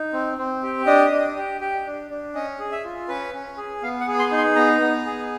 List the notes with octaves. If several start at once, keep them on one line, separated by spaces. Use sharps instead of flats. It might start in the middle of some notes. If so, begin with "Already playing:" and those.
Already playing: D#4
C4
C4
G4
D4 D#5
D4
G4
G4
D4
D4
C#4 D#5
G#4
E5
F4
C#4 B4
C#4
G#4
B3 F5
F#5
G#4
C6
D#4
C6
B3 A#5
B3
G#4